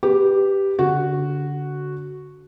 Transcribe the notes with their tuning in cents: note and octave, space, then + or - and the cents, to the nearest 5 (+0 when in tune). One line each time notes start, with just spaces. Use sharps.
G4 +0 B4 +0
D3 -30 F#4 +0